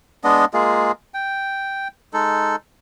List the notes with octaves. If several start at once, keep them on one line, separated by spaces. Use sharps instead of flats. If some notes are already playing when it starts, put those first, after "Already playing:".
G#3 B3 D4 D#5
G#3 A#3 F4 G#4
G5
G#3 D#4 A4